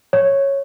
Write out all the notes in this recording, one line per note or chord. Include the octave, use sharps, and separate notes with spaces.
C#5